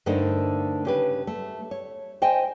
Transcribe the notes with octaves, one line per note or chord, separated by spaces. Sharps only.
G2 D3 A3 D#4 A#4 C5
C#3 G4 B4
A3
C#5
C5 D#5 G5 G#5